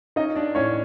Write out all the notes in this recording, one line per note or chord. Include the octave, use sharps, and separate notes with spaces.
C#4 D#4 D#5
D4 D5
A2 C#4 C#5